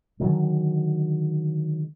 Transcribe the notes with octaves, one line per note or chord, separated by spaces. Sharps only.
D3 D#3 F#3 G#3